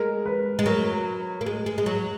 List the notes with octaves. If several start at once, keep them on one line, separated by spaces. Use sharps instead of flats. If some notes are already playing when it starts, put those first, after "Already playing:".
Already playing: G#3 A#4
B4
G#3
F#3 A#4
A#3
G#3
G#3
G#3
F#3